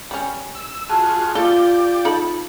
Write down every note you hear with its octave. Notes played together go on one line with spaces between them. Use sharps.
G3 C#4
E6
F4 F#4 G#4 A5
F4 G4 A4 D5 G7
D#4 A4 B5